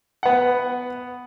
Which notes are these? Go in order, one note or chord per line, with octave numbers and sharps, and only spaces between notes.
B3 F#5